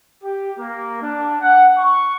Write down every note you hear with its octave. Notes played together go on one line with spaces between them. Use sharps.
G4
A#3
D4
F#5
C#6